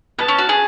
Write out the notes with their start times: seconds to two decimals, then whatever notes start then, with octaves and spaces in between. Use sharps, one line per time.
0.19 B3 A5
0.28 C#4
0.38 F#4
0.49 G#4